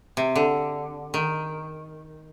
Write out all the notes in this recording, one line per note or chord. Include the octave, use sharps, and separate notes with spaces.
C3
D3
D#3